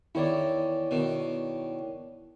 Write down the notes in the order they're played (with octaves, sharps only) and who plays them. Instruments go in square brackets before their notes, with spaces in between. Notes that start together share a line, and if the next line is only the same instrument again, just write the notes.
[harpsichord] E2 D#3 [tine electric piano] E4 C#5 D5
[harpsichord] B2 D#3